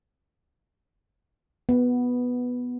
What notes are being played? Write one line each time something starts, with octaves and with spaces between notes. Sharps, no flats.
B3